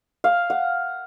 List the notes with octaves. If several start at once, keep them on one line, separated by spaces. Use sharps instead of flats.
F5
F#5